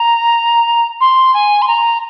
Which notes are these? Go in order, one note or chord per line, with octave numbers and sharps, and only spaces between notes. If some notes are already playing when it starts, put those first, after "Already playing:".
Already playing: A#5
C6
G#5
C6
A#5